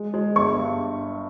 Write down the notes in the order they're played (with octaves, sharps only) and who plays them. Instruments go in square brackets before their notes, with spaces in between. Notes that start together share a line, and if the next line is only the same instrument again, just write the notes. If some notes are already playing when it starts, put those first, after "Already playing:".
Already playing: [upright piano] G#3
G#3
G1 C#6
G2